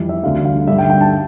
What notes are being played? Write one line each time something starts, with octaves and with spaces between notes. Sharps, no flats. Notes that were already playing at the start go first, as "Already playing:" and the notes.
Already playing: F2 E3 G3
E5
D2 D3 G3 F5
F5
G2 D3 G3 E5
G5
G5
A5